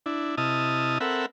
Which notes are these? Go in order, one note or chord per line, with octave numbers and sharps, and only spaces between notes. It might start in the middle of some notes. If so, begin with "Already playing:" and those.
D4 E4
C3 E4 D#5 A5 D#6 F6
C4 A4 A#4 E5 F#5 B5